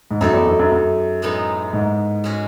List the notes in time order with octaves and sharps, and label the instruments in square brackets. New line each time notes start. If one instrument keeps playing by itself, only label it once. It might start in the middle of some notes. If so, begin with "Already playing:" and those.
[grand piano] G#2
[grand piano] F#2 [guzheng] A3 D#4 A4
[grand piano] E2
F#2
F#2
F#2
[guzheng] A2 G#3 B3 D#4
[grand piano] G#2
[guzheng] G#3 C#4 F#4